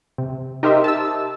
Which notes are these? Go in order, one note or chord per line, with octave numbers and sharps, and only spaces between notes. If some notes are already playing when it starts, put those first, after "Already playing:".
C3
D#4 G4 A#4 C5 D#5 E5
A5 E6